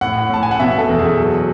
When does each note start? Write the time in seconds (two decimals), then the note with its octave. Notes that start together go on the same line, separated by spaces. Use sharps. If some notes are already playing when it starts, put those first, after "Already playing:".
0.01 A2 F#5
0.30 A2 A5
0.43 G#5
0.51 F#5
0.60 B2 E5
0.78 A4
0.89 E2
0.99 G#4
1.19 F#3